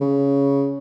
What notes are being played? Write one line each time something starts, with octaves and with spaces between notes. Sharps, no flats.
C#3